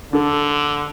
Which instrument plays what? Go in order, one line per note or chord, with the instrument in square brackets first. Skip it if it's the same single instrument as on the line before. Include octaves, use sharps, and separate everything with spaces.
[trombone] D3 [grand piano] D4 A4